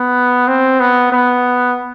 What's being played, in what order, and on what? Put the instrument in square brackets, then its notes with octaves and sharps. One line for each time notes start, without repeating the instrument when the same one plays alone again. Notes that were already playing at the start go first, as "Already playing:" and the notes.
Already playing: [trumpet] B3
C4
B3
B3